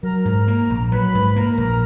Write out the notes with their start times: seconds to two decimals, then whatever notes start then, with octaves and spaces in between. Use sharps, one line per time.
0.03 F#3 A#4 A#5
0.25 G#2
0.48 A#3
0.70 A#1
0.92 F#3 B4 B5
1.15 G#2
1.36 A#3 A#4 A#5
1.58 A#1